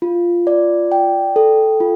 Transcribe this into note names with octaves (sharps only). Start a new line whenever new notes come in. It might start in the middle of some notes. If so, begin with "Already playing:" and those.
F4
D5
G5
A4
F4